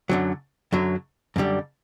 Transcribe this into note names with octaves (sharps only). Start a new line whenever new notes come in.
F#2 D3 F#3
F#2 D3 F#3
F#2 D3 G3